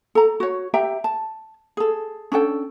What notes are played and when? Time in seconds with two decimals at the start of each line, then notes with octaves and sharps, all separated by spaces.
0.15 A4 A#5
0.40 F#4 C#5
0.74 G4 E5 G5 A#5
1.04 A5
1.77 G#4 A4
2.32 C#4 D4 A4 G5